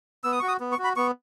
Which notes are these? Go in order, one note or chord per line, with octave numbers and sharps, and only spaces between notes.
B3 E6
D#6
F#4 C#6
D#6
B3
C#6
F#4
B5
B3 C#6